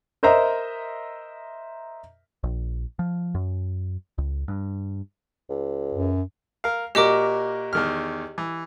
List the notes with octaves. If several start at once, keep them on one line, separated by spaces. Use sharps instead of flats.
A#4 C5 D#5 E5 A#5
A#1
F3
F#2
C#2
G2
C#2
F#2
A#4 F5
A#2 F#4 G4 A#4 D#5 D6
E2 D#3 F6
E3